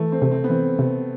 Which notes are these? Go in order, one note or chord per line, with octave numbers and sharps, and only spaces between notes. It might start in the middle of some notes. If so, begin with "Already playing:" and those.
Already playing: E3 A3
C4
C3
C4
B3
E3 C4
C3